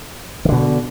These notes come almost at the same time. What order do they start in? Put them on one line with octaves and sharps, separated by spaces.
D#3 D3 B2